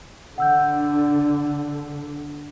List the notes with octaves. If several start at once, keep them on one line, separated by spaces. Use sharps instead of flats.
D3 F#5 E6 G6